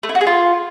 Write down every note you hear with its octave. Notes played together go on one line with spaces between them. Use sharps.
A3
E4
F#4
G#4
F4